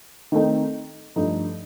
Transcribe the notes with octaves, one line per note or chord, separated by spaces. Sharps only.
D#3 A3 C4 D#4
G2 F3 A3 D#4